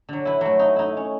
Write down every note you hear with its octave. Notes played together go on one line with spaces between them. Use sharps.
D3 F#3
E4 B4
F#3 A3
D#4
D#4 E4
C#4